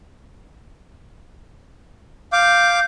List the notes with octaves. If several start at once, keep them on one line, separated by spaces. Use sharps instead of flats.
F5 D6 G6